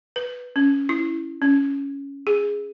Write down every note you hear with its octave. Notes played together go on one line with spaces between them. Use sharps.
B4
C#4
E4
C#4
G#4